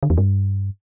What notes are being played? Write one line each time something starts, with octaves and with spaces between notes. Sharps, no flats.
D3
E2
G2